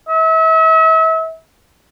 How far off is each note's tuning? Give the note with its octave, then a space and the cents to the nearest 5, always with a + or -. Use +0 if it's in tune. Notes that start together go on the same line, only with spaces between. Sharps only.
E5 -35